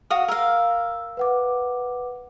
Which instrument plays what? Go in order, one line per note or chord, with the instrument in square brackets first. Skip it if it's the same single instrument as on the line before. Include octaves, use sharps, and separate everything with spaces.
[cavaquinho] F#4 F5 D#6
[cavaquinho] A#4 F5 [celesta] E6
[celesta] B4 F#5 D6